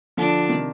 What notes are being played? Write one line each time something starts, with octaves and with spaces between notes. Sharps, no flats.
D3 F3 D4
C3 D#3